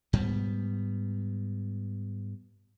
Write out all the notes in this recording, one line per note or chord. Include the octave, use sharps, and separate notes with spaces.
G#2 G3 B3